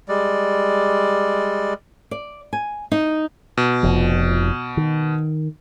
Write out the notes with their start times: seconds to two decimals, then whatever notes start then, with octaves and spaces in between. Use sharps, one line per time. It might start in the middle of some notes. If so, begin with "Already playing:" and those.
0.08 G3 G#3 D5
2.11 D5
2.53 G#5
2.92 D#4
3.57 B2
3.83 F1 F3
4.77 D#3